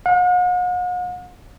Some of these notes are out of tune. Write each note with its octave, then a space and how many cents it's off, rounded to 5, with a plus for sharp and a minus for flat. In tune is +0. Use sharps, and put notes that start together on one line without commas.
F#5 -45